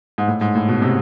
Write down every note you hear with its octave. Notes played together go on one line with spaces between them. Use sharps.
G#2
A2
G#2
A2
B2
C3